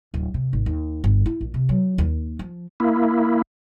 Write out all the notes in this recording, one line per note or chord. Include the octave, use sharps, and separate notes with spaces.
D1
C3
G#1
D#2
G1
E4
A#1
C3
F#3
D#2
F3
A#3 E4